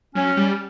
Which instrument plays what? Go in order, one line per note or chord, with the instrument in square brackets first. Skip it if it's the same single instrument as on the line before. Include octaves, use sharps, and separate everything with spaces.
[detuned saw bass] F#3 [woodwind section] C#4
[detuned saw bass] G3